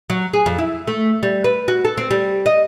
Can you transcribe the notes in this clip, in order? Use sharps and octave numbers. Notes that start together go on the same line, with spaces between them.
F#3
G#4
F2
E4
A3
G3
B4
F#4
A4
C4
G3
D#5